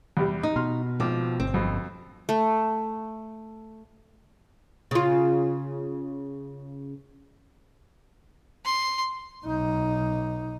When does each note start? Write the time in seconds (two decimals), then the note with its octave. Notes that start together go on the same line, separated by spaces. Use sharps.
0.17 E2 C3 G3
0.43 D#4 D#5
0.56 B2 C6 F6
1.00 G#1 F3 D6
1.40 G1 C4
1.54 F2 B2
2.29 A3
4.91 C#3 F4
8.65 C6
9.45 B1 D#4